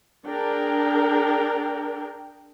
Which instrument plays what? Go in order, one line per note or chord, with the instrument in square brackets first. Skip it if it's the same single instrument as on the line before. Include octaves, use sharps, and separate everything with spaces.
[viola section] D4 G#4 A#4 G5